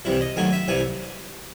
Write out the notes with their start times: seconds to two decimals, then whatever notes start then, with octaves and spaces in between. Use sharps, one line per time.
0.05 C2 C3 E3 E4
0.21 D#5
0.36 D#2 D#3 F#3 A3 G#5
0.53 E5
0.68 C2 C3 E3 G#5